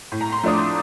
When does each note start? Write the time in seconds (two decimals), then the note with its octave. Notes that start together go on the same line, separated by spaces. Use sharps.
0.12 A2
0.21 A#5
0.32 C6
0.43 F3 A3 D4 D#6
0.53 D6